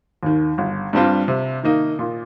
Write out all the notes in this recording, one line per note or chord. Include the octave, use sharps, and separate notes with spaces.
D#2 D#3
G1
G2 G3 C4 F4
C3
D#3 A#3 D#4
A#2